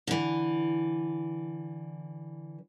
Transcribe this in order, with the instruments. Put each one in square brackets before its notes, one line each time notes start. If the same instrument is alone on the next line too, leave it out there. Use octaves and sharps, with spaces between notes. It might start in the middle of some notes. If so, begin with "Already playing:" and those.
[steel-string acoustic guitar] D3 E3